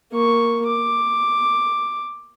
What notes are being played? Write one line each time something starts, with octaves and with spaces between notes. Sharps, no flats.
A#3 C#6
D6